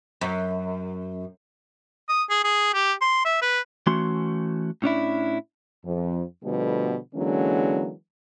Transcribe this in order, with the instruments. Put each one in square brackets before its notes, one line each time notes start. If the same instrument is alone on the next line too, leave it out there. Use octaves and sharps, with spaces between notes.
[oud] F#2
[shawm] D#6
G#4
G#4
G4
C6
E5
B4
[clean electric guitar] E3 A3 C#4 F#4 C6
A2 C#4 D4 E4
[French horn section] F2
B2 D3 F3 G3 A3 B3
D3 E3 F#3 G#3 A#3 C#4